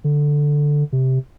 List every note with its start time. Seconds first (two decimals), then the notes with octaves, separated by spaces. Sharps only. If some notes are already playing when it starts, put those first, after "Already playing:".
0.04 D3
0.92 C3